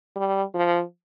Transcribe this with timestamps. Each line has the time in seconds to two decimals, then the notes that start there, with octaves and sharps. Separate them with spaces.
0.16 G3
0.55 F3